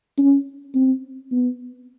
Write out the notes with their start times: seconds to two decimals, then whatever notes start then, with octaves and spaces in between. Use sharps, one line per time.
0.18 C#4
0.75 C4
1.31 B3